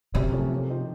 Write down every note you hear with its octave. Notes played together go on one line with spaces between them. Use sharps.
F#2 C3
F3 A3 C#4
A#2
F3 C4 D#4